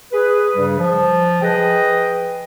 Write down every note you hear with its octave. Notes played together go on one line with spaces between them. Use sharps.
G#4 B4
G2 C#3 G3
F3
G#4 B4 D#5 G5